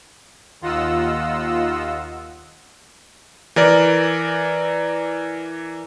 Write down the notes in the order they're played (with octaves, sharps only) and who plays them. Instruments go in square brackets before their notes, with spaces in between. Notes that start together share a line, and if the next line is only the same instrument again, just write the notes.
[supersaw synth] D#2 F4 D#5 F#5 E6
[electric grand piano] E3 A#4 D5